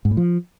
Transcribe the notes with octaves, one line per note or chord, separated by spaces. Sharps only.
G#2
A2
F3